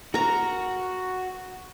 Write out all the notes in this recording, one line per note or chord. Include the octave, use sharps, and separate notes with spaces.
F#4 A#4 A#5